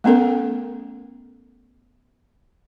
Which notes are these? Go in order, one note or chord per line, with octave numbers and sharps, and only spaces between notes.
A3 B3 C#4 A4 A#4